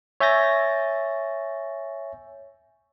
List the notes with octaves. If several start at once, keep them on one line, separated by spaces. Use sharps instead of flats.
C#5 E5 G#5 G6 A6 A#6